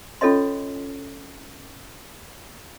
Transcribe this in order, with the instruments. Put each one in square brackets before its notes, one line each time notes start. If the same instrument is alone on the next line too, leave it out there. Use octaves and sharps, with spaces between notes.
[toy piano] C#4 F4 A4 C#5 D#5 C6